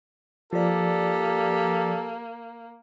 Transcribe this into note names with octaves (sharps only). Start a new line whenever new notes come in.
F3 A#3 G4 A4 D5